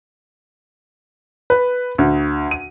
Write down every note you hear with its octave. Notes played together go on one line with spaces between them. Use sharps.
B4
D2
D#7